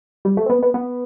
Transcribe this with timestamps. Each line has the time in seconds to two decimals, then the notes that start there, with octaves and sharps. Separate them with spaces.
0.25 G3
0.37 A3
0.46 C4
0.50 B3
0.63 B3
0.74 B3